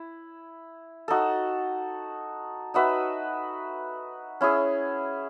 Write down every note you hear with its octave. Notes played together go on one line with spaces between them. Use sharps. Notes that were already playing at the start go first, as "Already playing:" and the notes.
Already playing: E4
D#4 F#4 A4
D#4 F#4 B4 E5
C#4 E4 G#4